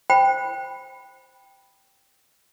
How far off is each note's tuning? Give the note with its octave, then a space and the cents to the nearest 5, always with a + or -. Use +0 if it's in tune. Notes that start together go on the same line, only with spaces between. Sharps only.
C5 +0 G5 +0 B5 +0